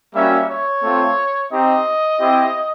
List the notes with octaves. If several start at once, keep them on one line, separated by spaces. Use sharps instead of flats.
G3 A#3 C#4 F#4 E5
C#5
A3 C4 F4
C4 D#4 G4 D#5
C4 E4 G4